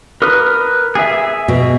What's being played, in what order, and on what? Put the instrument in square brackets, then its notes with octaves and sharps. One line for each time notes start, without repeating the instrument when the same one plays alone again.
[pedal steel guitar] A#4 B4 D#6
G#4 E5
[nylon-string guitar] B2